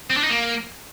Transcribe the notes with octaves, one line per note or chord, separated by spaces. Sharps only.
C4
D4
D#4
A#3